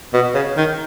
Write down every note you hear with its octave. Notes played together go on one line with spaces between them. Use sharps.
B2
C#3
D#3